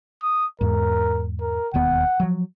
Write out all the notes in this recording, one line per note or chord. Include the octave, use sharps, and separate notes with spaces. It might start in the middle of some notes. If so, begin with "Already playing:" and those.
D#6
E2 G#2 A#4
A#4
E1 D#2 B3 F#5
F3 F#3